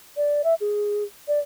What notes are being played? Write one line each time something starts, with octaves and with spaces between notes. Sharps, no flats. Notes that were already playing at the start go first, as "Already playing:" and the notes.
D5
E5
G#4
D5